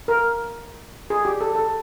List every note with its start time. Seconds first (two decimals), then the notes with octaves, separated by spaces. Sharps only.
0.08 A#4
1.10 G#4
1.25 G4
1.41 A4
1.55 A4